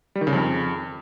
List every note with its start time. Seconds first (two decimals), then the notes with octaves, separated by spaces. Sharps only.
0.15 G3
0.21 D#3
0.27 C#3
0.33 F2